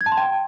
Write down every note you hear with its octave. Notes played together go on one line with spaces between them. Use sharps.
G#6
A5
C6
G5